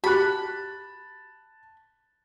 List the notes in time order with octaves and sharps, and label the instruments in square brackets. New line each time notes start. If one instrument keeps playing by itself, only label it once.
[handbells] F#4 G4 [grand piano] A5 F#6 [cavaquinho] B5